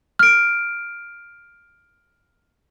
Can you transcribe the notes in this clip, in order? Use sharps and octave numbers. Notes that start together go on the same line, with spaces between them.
F6 D7